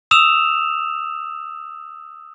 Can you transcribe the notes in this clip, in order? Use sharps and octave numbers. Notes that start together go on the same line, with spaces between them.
D#6 E6 E7 F7